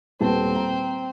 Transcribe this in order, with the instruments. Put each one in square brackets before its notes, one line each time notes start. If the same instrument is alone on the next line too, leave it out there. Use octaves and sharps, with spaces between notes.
[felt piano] D#1 B3 A5 [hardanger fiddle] C4
[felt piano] A#5